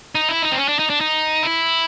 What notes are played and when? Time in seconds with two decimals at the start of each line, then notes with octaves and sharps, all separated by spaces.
0.15 D#4
0.29 E4
0.42 D#4
0.52 C4
0.58 C#4
0.69 D4
0.79 D#4
0.90 D4
1.01 D#4
1.43 E4